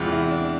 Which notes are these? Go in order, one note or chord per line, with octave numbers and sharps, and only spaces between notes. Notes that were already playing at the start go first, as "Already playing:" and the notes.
Already playing: E2 C3 E3 G#3 F4
E4
D4